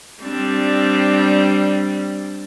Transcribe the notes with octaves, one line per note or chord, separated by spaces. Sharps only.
G3 C4 D4